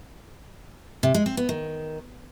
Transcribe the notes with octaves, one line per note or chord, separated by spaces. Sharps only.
C3
G#3
C4
B3
D#3